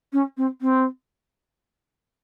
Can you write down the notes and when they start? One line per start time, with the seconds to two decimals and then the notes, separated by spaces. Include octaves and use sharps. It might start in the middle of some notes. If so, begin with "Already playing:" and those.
0.13 C#4
0.37 C4
0.61 C4